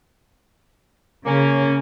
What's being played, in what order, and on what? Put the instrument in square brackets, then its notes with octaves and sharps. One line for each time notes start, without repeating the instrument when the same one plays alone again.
[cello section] C#3 [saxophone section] A#3 C#4